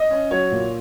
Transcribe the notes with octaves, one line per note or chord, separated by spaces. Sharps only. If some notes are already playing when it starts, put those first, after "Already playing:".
Already playing: D#5
C#4
F#3 C#5
A#2